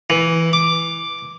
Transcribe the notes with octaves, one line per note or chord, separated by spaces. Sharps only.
E3
D6